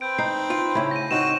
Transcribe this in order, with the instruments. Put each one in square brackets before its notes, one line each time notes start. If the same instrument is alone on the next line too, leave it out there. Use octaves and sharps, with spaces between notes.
[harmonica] C4 B4 [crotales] G6 D7
[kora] D#4 [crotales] C7
[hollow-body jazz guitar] F4
[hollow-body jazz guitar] A2 C#3 [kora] E4
[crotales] A#6 D#7
[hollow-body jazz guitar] C#2 D#4 [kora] C4 [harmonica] F#4 [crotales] E7